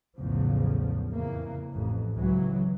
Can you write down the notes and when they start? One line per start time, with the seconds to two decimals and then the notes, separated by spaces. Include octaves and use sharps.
0.16 B1 E2 A2 C#3 F3
1.12 F2 C#3 E3 A#3
1.74 A1 F2
2.15 C#2 E3 F#3